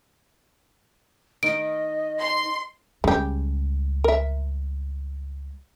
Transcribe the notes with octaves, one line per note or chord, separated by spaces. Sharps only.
D#3 D#4 D#5 D7
C6
C#2 C#3 G3 G4
A#4 E5